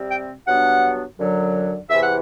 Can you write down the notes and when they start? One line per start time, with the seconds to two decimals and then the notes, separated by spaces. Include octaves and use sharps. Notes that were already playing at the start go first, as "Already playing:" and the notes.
Already playing: C3 G3 C4
0.11 G5
0.47 G2 F#3 B3 D4 F#5
1.19 F#2 D3 F#3
1.90 E2 C3 E3 E5
2.03 F#5